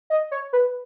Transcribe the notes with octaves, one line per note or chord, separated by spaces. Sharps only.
D#5
C#5
B4